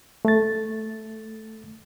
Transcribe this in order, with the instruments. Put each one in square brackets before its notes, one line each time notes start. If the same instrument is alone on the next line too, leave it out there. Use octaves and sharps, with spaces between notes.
[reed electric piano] A3 A6